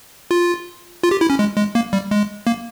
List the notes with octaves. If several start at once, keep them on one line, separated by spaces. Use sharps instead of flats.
F4
F4
G4
E4
C#4
G#3
G#3
A#3
G3
G#3
A#3